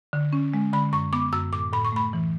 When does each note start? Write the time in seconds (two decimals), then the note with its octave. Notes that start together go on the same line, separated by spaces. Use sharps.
0.13 D3
0.33 C#4
0.54 G#3
0.73 D3 B5
0.93 F#2 C#6
1.13 B3 D6
1.33 F#2 E6
1.53 A2 D6
1.73 A2 B5
1.85 C#6
1.92 A3 B5
2.13 E3